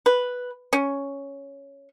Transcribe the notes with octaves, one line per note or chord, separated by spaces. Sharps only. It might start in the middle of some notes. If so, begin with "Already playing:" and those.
B4
C#4